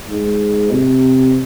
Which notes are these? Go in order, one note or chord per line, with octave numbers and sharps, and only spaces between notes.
G#2
C3